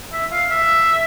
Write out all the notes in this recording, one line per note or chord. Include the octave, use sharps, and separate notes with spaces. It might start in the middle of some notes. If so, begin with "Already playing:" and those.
E5
F5
E5